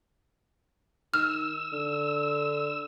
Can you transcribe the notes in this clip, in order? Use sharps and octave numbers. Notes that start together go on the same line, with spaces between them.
D#3 E6 F6
D3